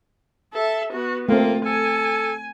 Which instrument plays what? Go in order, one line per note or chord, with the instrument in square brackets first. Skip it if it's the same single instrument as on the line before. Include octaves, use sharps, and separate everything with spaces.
[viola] A4 E5
B3 F#4
[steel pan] A3 C4 [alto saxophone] A#3 [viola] F4
[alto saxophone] A4 [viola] G#5